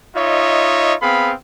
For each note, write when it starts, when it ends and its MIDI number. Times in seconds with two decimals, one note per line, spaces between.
0.16 0.94 63
0.16 0.94 65
0.16 0.94 73
0.16 0.94 75
0.16 0.94 76
1.02 1.33 59
1.02 1.33 60
1.02 1.33 68
1.02 1.33 77
1.02 1.33 83